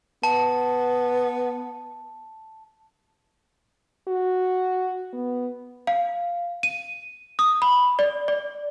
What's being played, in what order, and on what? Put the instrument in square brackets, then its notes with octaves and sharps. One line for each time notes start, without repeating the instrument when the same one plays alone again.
[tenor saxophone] B3 [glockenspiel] A5
[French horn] F#4
B3
[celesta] F5
D#7
D#6
B5
D5
D5